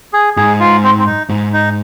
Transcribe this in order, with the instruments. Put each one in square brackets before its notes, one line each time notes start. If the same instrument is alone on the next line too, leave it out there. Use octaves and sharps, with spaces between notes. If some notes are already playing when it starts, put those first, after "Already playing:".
[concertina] G#4
[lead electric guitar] G#2 [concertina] G#4
[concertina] F4
C4
C4
D#4
[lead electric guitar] G#2
[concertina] D#4